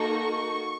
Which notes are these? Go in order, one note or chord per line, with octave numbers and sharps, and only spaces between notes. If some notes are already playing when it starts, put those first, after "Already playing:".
Already playing: A#3 D#4 F#4 A4 C#6